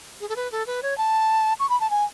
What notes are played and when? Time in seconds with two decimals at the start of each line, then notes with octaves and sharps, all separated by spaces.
0.21 G#4
0.29 A4
0.36 B4
0.52 A4
0.66 B4
0.82 C#5
0.98 A5
1.59 C#6
1.69 B5
1.80 A5
1.90 G#5